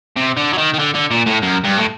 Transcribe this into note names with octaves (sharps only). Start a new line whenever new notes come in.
C3
D3
F#3
D#3
D#3
D3
D3
A#2
A2
F#2
G2
A2